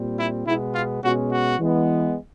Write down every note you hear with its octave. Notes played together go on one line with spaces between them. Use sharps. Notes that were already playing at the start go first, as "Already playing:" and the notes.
Already playing: A#2 G3 C4
E4
B2 G#3 B3 E4
F4
B2 G#3 C#4 F#4
F#4
E3 G#3 B3